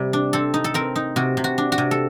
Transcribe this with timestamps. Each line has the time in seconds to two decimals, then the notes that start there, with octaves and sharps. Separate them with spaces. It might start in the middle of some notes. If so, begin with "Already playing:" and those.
Already playing: C3 G3
0.13 D4
0.33 C4 A4
0.54 D#4
0.64 A4
0.74 C4 A#4
0.96 D#4
1.16 C3 F#4
1.37 C3
1.44 F#4
1.58 D4
1.72 F#4
1.78 C3
1.91 A4